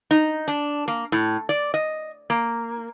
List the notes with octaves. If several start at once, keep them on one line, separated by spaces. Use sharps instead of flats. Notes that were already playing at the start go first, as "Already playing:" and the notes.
D#4
D4
A#3
A2
D5
D#5
A#3